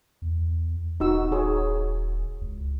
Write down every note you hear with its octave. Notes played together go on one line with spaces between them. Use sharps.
E2
D#1 D#4 F#4 E6
F#4 G#4 C#5
C#2